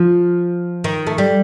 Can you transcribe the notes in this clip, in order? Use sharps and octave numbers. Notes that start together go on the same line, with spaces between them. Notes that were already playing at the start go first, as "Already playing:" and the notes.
Already playing: F3
D#3
A3
G3